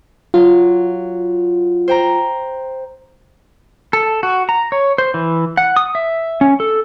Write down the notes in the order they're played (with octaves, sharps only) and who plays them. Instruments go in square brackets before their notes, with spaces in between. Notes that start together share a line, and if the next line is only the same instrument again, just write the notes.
[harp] F#3 [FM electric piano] F4
[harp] C5 G5 A#5
[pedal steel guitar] A4
F#4
A#5
C#5
C5
E3
F#5
D#6
E5
C#4
A4